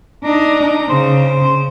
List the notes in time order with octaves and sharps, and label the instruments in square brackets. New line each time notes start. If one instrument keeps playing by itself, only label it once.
[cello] D4 D#4 [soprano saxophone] A#5
[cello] C#3 [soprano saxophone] C5